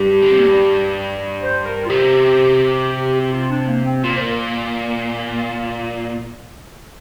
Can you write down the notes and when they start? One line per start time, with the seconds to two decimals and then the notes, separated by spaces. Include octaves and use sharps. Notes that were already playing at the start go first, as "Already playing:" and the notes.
Already playing: G2 G4
0.22 D3
0.30 C3
0.38 A#2
0.47 G2
1.42 C5
1.66 A#4
1.85 F4
1.89 C3 G4
3.20 G4
3.31 F4
3.50 D4
3.68 A#3
3.85 C4
4.03 A#2 F4
4.16 C5
4.21 A#4